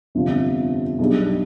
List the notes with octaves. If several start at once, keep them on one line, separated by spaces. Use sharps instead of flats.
G1 F2 C3 F3
B1 B2 G3 D4 G#4